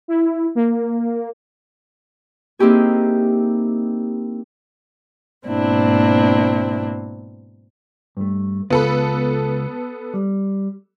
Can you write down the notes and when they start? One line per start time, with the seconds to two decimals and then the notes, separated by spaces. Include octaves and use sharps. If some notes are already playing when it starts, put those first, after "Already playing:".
0.08 E4
0.55 A#3
2.59 A#3 C4 D#4 E4 G4 G#4
5.46 G#2 B2 A#3 C4 D4 E4
8.17 G2 A3
8.70 C#2 B3 F4 A4 B5
10.14 G3